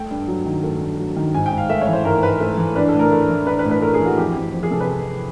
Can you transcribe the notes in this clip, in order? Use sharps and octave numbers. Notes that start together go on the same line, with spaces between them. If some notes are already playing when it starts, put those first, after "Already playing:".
Already playing: A3 G5
G2
F#3
D#3
A3
G2
F#3
D#3
G#2 G#5
G5
G#2
F5
A3 E5
C#5
E3
C5
G#2 A#4
G#2 B4
A3
E3
D4 B4
A4
A2 A#4
A3
E3
D4 B4
B4
A2
B4
A3 A#4
G#4
E3
F#4
F2 G4
F2
F3
G#4
C3 A4
B4
F2